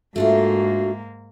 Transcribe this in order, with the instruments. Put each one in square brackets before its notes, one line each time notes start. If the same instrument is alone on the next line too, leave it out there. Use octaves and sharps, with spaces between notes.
[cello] G#2 A#3 [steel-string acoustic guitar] A3 D4 F4 [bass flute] F#4